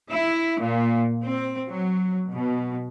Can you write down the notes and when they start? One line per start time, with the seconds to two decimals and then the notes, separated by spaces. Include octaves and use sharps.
0.10 E4
0.60 A#2
1.22 C4
1.69 F#3
2.32 B2